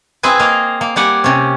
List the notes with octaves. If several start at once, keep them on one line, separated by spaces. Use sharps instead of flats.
C4 E4 G#4 B4 G#5
A#3 D#5 F5
A#3
G3 A#3 G4 F#5 G#5
C3 C#4